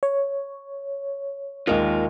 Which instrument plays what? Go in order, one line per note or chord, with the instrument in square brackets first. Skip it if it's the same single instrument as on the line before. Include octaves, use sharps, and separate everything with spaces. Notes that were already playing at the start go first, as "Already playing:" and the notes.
[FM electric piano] C#5
[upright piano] D#2 G#3 D#5 [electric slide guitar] F4 A#4 F5